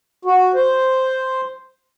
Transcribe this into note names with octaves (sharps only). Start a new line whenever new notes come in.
F#4
C5